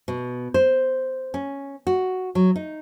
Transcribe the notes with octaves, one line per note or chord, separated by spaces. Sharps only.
B2
C5
C#4
F#4
F#3
D#4